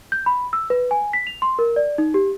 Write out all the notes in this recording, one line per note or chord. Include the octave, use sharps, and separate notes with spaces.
G6
B5
E6
B4
G#5
B6
F7
C6
A#4
D5
D#4
G4